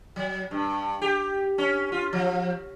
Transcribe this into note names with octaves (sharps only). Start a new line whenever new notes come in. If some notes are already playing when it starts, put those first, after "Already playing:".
F#3
G2
G4
C#4
F4
F3